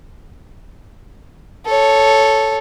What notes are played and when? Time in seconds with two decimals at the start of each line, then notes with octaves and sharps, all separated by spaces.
1.66 A4 C#5